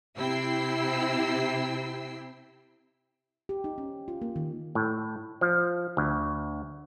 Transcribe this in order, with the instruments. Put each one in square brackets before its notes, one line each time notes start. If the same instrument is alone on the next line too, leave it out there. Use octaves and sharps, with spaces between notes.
[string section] C3 E4 G5 E6 C7
[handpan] G4
D#4
C#4
F4
A#3
D#3
[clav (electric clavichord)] A2
F3
D2